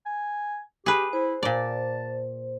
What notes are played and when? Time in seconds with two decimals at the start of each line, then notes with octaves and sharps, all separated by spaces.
0.06 G#5
0.86 G4 G#4 B4
1.13 E4 C5
1.43 A#2 D5 A5